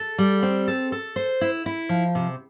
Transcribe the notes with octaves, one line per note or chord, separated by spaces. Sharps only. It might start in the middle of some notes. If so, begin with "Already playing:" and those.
Already playing: A4
G3
C4
A4
A4
C5
E4
E4
F3
C3